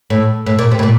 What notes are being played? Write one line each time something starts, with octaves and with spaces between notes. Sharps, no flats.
A2
A2
A#2
C3
A2
A#2